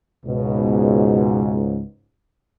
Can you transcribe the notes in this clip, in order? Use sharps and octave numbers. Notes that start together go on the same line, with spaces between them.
C#2 G#2 B2